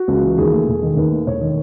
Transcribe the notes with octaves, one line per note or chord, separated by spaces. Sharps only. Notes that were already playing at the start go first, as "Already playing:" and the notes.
Already playing: F#4
C#2
E3
D#2 G#4
A3
E1
D#3
D#2 B4
A3
E1 C#5
D#3